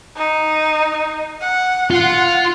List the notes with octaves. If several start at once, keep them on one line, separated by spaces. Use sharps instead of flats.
D#4
F#5
F4 F#5